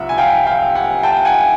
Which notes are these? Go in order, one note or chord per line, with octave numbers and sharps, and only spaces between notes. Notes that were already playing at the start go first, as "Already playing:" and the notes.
Already playing: C2 C3 F3 E5 F#5
G#5
F5 G5
F5 G5
F#5 G#5
G5 A5
F#5 G#5